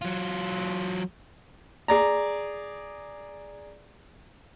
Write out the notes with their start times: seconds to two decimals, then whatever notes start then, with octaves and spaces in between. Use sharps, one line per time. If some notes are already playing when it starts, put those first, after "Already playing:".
0.02 F#3 F4
1.88 G#4 D5 A#5